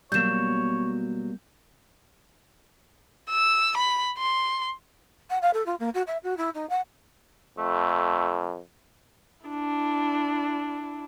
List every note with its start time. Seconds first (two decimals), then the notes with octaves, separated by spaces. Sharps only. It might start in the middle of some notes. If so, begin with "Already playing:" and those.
0.12 B2 F#3 G3 A#3 C#5 G6 E7
3.30 E6
3.78 B5
4.19 C6
5.30 F#5
5.41 F5
5.53 A4
5.66 F4
5.79 A#3
5.94 F#4
6.07 E5
6.23 F#4
6.37 E4
6.54 D#4
6.69 F#5
7.58 F2 A3
9.45 D4 E4